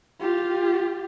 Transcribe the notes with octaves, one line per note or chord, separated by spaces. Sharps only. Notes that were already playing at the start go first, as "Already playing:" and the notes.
F4 G4